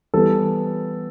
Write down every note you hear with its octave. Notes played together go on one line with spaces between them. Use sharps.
E3 G3 B3 A4